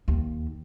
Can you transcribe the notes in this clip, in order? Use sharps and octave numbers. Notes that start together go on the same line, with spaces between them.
D#2